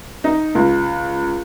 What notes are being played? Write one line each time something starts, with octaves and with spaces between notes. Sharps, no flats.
D#4
C#2